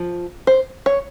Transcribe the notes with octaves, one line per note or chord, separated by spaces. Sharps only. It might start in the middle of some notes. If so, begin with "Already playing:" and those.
Already playing: F3
C5
C#5